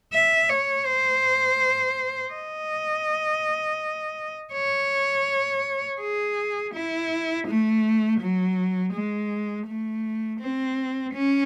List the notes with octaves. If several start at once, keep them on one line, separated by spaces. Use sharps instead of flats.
E5
C#5
C5
D#5
C#5
G#4
E4
A3
F#3
G#3
A3
C4
C#4